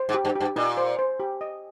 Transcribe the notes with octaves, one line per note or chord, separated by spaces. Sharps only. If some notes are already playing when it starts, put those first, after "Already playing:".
Already playing: C5
G#2
G4
G2
G4
G2
A#2 D#4
C5
C5
G4
D#5